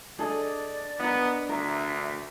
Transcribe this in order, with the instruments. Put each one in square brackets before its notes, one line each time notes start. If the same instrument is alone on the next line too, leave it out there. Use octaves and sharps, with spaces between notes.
[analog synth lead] D4 [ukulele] G#4 A4 D#5 [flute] D5
[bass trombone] B3 [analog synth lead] D4 [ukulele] A#4 D#5
[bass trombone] D2 [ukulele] A#4 [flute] E5